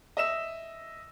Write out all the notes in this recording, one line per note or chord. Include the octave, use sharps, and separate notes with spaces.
D#5 E5 E6 E7